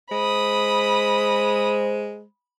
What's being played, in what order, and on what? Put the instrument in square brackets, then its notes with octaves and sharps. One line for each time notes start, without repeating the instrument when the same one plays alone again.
[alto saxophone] G#3 [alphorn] C5 [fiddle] B5 D#6